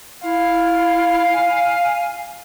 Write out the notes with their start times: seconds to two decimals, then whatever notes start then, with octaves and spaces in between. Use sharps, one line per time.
0.23 E4 F5
1.32 G#5